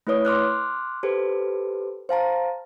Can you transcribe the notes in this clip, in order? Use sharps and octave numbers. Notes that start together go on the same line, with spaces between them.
A3 E4 B4 C#5 D#6
C6 D6 F6 F#6
G4 A4 B4 C5
C5 F5 A5 A#5